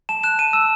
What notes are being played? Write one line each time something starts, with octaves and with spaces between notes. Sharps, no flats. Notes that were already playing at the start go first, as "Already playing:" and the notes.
A5 E7
F#6 E7
A5 D#7
E6 E7